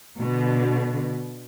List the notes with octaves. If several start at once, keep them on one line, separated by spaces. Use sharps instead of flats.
B2 D3